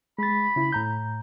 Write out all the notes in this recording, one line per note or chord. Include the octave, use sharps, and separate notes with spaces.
G#3 B5 A6
C#3 E4
A2 A#5 G6